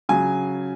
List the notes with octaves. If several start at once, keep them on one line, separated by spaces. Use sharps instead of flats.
C#3 F#3 G#5